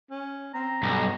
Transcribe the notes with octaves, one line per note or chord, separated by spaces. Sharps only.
C#4
C4 A#5
B1 G2 B3